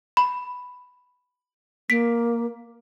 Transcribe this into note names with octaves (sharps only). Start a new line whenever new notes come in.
B5
A#3 B6 D7